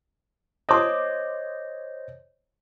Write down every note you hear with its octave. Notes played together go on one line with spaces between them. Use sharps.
C5 C#5 D#5 C6 D6 D#6